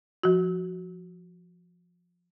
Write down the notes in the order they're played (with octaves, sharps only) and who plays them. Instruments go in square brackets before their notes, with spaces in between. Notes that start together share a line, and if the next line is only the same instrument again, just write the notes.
[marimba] F3 F#4